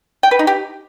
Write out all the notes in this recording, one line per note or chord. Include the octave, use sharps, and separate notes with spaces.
G5
B4
D#4
G4